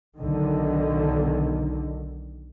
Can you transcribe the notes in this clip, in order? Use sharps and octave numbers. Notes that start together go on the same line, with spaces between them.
B1 D3 D#3